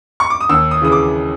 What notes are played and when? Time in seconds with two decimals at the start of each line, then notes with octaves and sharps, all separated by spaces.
0.20 C#6
0.30 D6
0.41 D#6
0.49 D#2 E6
0.71 D#6
0.82 C#3 E3 D#6
0.92 D6